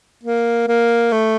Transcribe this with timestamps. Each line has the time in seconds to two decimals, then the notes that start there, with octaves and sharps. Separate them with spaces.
0.23 A#3
0.68 A#3
1.12 A3